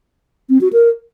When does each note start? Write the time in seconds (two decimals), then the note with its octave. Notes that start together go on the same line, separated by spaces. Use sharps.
0.49 C4
0.61 F#4
0.73 A#4